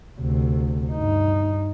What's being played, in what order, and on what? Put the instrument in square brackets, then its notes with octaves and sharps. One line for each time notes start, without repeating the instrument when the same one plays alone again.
[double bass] D2 C3
G2 D#4